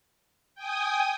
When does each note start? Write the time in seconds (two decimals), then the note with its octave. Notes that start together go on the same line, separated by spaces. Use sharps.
0.55 G5 G#5 D#6